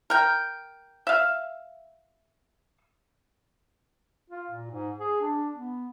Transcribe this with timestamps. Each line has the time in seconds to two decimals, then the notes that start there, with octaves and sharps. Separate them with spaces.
0.10 A#4 G5
1.07 E5 F5
4.30 F4
4.50 A#2
4.71 G#2
5.00 G#4
5.21 D4
5.53 B3